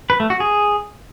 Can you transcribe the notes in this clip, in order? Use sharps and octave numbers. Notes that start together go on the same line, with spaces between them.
B4
A3
F#4
G#4